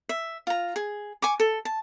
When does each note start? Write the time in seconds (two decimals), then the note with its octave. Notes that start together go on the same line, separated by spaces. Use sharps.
0.09 E5
0.47 F4 A#5
0.76 G#4
1.22 G#5 C#6 D6
1.40 A4
1.65 A5